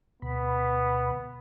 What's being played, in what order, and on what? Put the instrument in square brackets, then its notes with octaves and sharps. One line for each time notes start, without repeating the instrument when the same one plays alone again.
[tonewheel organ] D2 B2 B5 [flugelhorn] B3